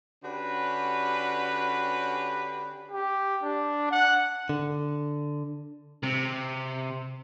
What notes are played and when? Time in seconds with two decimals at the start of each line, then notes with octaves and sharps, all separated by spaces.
0.24 D3 C#4 D4 F#4 G4 B4
2.92 G4
3.42 D4
3.91 F#5
4.49 D3
6.03 C3